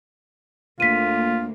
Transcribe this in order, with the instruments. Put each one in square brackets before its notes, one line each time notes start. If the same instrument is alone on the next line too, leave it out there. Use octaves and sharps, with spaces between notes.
[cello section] D2 A#3 [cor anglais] F4 [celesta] B6 D#7